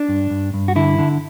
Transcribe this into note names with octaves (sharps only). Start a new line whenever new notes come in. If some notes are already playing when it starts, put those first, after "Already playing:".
Already playing: D4
G2
G2
G2
F#4
D3 E4
D3